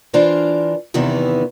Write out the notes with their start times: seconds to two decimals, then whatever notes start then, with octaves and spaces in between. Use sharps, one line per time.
0.14 E3 D4 F4 A#4 C5
0.94 E2 C3 D#3 E3 B3 E4